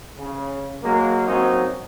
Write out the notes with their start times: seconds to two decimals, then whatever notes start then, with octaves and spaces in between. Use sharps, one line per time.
0.18 C#3
0.82 F#3 G#3 A#3
1.27 F#3 A#3 C4 C#4 D#4